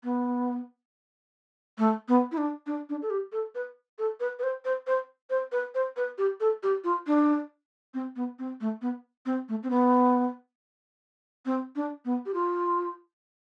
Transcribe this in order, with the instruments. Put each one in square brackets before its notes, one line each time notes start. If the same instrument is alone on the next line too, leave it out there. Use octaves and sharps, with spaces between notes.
[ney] B3
A3
B3
E4
D4
D4
D4
A4
G4
A4
B4
A4
B4
B4
C5
C5
C5
C5
B4
C5
B4
G4
A4
G4
F4
D4
C4
B3
C4
A3
B3
C4
A3
C4
B3
C4
D4
B3
G4
F4